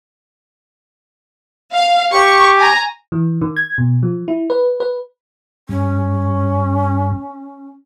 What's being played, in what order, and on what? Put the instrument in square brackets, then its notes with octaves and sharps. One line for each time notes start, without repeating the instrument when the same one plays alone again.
[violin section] F5
[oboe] G4 [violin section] C#6
[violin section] G#5 A#5
[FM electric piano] E3
D#3
G#6
B2
F3
E4
B4
B4
[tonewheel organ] G2 [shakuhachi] C#4